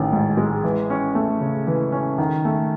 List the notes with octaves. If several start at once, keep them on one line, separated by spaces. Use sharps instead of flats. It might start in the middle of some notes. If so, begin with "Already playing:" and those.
Already playing: A1 D#3
G#2
G#3
E3
C#4
A3
C#3
E3
C#4
D#3
A3